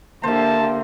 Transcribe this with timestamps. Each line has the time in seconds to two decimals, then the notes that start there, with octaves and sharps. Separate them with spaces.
0.23 D3 A#3 G4 A4 C5 E5 A5